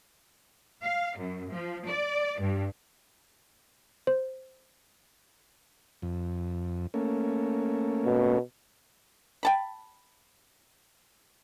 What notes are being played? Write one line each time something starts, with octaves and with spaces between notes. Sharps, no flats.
F5
F#2
F3
D5
G2
C5
F2
A3 A#3 C#4
B2
G5 A5 B5